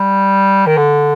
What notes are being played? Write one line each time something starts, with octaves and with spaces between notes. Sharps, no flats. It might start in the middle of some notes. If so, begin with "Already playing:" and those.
Already playing: G3
D#3
D3